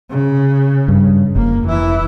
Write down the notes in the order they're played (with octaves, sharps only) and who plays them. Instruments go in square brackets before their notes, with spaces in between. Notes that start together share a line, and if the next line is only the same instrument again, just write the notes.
[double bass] C#3
[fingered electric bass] G2
[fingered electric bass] F1 [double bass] A#3
[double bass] E3 E4